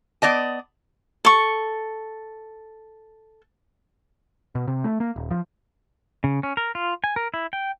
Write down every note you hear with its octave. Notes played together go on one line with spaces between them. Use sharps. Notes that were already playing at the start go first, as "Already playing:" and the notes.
B3 D5 D#5 A5
A4 C#6
B2
C3
A3
A#3
D#1
F3
C#3
C#4
A#4
F4
G#5
A#4
E4
G5